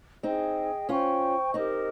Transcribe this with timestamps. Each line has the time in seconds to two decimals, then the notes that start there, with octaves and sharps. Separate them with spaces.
0.23 C4 D#4 G#4 D#5 G5
0.89 C#4 F4 C5 G5 C#6
1.54 C4 D#4 G4 A#4 D#5